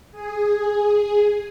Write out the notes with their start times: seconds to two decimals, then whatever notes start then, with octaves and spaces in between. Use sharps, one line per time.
0.12 G#4